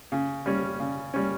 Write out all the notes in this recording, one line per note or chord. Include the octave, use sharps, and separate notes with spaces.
C#3
G3 C#4
C#3
G3 C#4